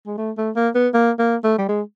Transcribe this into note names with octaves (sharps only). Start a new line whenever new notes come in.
G#3
A3
A3
A#3
B3
A#3
A#3
A3
G3
G#3